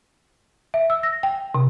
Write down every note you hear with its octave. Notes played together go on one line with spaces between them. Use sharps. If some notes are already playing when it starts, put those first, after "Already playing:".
E5
E6
A#6
G5
C3